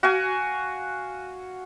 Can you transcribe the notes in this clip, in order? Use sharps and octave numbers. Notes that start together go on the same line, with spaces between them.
F#4 F5 G#5